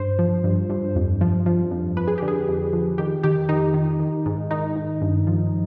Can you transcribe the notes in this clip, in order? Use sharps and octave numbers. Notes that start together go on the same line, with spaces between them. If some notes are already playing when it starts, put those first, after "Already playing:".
Already playing: G2 C5
F3
G2
G2
F2
F3
F3
F2
F3 B4
G#4
D3 G4
G#4
F2
F3
D#3 G4
D#3 G4
D#3 D#4
D#3
D#3
G#2
D#3 D#4
G#2
G2
F3